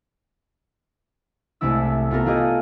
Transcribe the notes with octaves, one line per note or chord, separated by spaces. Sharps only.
C2 G#3 A3 E4 E6
A3 B3 F4 A4 A#4
A3 F4 G4 G#4 D#5